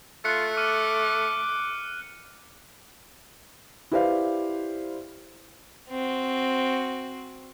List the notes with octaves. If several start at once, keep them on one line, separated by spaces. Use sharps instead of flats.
A3 F4 F#6 C#7
D6 F6 D#7
E4 G4 B4 C5 D5 F5
C4 F#4